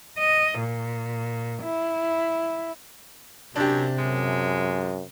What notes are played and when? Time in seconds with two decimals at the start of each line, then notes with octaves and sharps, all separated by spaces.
0.19 D#5
0.59 A#2
1.63 E4
3.56 F#2 C3 D4 G4
3.99 F#2 G#3